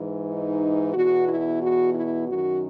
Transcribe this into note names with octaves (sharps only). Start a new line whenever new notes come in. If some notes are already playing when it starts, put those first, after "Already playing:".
Already playing: G#2 E3
D#4
E2 B2 F#4
E4
F#4
E4
F#2 D#3 F#4